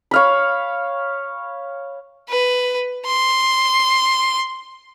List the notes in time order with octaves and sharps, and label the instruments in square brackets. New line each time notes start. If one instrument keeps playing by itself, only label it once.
[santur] C#5 F5 B5
[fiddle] B4
C6